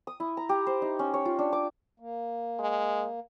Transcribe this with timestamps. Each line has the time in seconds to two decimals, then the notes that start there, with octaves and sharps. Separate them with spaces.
0.07 D#6
0.20 E4
0.37 A#5
0.49 G4
0.67 C5
0.82 D#4
0.99 C#4
1.14 C#5
1.25 F4
1.39 D4
1.53 D6
2.00 A#3
2.59 G#3